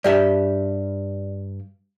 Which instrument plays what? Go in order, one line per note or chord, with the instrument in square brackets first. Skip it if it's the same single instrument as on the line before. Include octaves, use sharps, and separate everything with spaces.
[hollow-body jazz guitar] G2 G4 E5 [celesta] D5